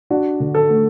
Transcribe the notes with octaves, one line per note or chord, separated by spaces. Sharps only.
D4 F#4
D3
A4
A3